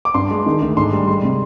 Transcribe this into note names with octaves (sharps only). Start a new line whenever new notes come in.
D6
G2 C6
G#3
D#3
D2
G#2 C6
G3
G#3 C6
C3